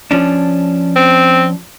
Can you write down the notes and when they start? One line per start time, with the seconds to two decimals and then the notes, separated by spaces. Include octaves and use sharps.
0.11 F3 C#4 D4
0.96 C4